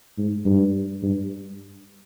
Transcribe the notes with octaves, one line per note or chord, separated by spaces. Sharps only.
G#2
G2
G2